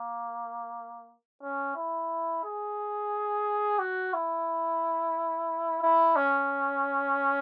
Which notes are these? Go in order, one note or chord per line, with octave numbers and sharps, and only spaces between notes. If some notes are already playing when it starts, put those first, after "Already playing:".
Already playing: A#3
C#4
E4
G#4
F#4
E4
E4
C#4